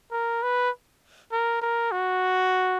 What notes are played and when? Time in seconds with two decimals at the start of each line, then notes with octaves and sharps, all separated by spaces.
0.12 A#4
0.42 B4
1.32 A#4
1.62 A#4
1.92 F#4